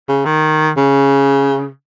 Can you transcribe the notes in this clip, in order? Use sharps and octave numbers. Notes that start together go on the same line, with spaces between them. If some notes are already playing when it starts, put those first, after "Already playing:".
C#3
D#3
C#3